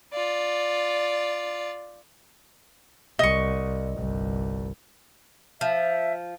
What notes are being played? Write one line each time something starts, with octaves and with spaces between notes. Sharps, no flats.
F4 D5
C2 D#5 C#6
G1 C2
F3 E5